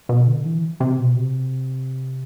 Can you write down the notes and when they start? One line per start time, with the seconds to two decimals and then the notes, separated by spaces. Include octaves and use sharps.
0.09 B2
0.28 D3
0.45 E3
0.80 C3
0.99 B2
1.16 C3